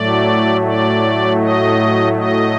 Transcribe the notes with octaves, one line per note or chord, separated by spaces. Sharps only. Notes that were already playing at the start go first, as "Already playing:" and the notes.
Already playing: A2 F#3 A3 D5
D5
D#5
D#5